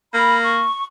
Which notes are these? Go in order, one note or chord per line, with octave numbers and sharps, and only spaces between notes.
A#3 B5
C#6